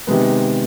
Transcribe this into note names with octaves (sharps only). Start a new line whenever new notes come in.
C3 D#3 G#3 B3